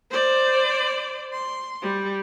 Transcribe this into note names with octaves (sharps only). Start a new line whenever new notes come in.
C5 D5
C6
G3